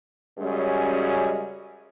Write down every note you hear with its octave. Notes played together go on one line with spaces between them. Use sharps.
F#2 C#3 G3 G#3 C#4 F#4